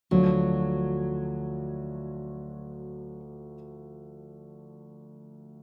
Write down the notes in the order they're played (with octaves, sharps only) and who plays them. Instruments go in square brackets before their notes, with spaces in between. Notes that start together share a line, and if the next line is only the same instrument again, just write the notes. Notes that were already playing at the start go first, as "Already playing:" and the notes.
[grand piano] D2 D3 F3 [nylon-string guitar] F#3